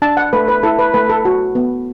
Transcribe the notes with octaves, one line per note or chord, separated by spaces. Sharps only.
D4 A5
F#5
A3 B4
B4
E4 A4
B4
A3 B4
A4
F#4
B3